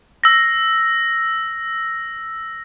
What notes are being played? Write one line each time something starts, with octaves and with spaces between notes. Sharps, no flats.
E6 A#6